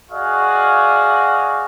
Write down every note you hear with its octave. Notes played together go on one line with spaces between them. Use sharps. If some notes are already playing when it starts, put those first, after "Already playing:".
F#4 G#4 D5 D#5 F5